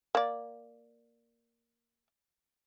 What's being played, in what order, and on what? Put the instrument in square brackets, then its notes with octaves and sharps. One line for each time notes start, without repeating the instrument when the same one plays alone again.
[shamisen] A#3 D5